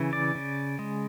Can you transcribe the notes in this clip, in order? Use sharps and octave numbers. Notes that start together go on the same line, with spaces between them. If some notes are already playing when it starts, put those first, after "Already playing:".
Already playing: C#3 E3
D5
C#3
G#3